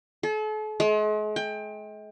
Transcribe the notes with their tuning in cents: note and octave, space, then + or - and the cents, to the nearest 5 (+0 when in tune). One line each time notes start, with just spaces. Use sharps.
A4 -40
G#3 +40
G5 +25